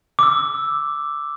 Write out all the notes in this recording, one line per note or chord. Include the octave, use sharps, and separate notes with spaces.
D6 E6